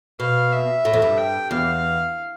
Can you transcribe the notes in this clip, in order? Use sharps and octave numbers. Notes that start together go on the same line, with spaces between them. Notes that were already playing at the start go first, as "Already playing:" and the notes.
B2 F5
E5
A2
F2
G2
G5
E2 F5